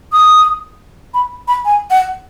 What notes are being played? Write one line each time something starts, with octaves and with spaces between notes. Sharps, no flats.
D#6
B5
B5
G#5
F#5